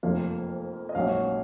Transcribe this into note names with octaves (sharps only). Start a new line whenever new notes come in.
F1 F2 F3 A#3 F5
D#5
A#1 G#2 F#3 A#3 C#4 F5